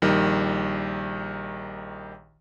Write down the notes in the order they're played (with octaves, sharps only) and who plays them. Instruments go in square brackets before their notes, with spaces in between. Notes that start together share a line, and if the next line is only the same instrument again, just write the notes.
[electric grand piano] A#1 D#3 G3